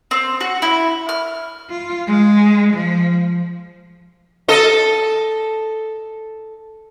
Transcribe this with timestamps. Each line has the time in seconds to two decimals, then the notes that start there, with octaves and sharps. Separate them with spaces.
0.11 C4
0.41 F#4
0.62 E4
1.09 F6
1.70 F4
2.07 G#3
2.74 F3
4.48 A4 D#5